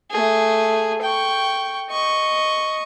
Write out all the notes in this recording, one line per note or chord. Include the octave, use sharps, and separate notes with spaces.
A3 G#4
G5 C#6
D#5 C#6